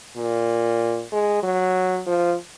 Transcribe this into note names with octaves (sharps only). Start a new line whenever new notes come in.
A#2
G#3
F#3
F3